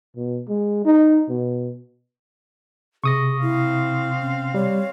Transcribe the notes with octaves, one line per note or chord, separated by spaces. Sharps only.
B2
G#3
D#4
B2
C3 G#4 C#6 D#6 A#6
C4 E4 F5
C#4
G3 C#5